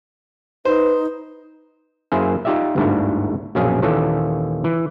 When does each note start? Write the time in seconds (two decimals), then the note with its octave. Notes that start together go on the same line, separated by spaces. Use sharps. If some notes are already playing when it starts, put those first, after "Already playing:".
0.65 D#4 B4 C5
2.12 F#2 A#3 E4 G#4 C5
2.45 D#4 F4 G4 D5 E5
2.76 G1 D2 G#2 D4 E4 F#4
3.55 A#1 F#2 B2 C#4 G#4 F5
3.82 D#2 A#2 E3 C#4 A4
4.64 E3